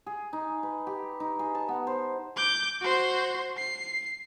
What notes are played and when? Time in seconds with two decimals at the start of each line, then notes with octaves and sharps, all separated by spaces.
0.06 G#4
0.33 D#4
0.63 B4
0.87 G4
1.20 D#4
1.39 G#4
1.55 A5
1.68 B3
1.87 C5
2.36 D6 G6
2.81 F#4 C5
3.57 C7